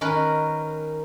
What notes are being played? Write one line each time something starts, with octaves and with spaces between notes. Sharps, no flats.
D#3 C#4 A#4 B4